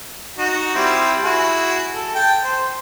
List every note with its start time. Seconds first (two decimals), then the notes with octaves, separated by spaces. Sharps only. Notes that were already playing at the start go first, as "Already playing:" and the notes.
0.38 D#4 F#4
0.75 G3 C4 E4
1.24 E4 F#4 G#4
1.92 A4
2.15 G5 A5
2.44 C5